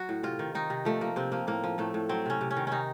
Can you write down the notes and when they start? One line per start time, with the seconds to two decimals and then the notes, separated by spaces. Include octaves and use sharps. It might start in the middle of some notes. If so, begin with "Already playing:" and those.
Already playing: F#3 F#4
0.09 A2
0.23 C3 F4
0.39 D#3
0.55 D#3 D#4
0.70 C3
0.85 F3 A3
1.01 F3 A#3
1.16 C3 C4
1.32 F3 A#3
1.47 A2 A#3
1.64 F3
1.78 A2 A3
1.94 A2
2.09 F#3 C4
2.26 C3 C#4
2.41 C3
2.51 C#4
2.57 D#3
2.67 C3 C#4 D#4